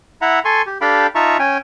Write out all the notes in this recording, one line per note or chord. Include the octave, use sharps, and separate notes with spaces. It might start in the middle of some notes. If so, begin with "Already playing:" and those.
E4 E5 F#5 A#5
A4 G#5 C6 C#6
G4
D4 G4 A4 F5 G5 B5
D#4 F4 E5 A5 A#5 C#6
C#4 G5 G#5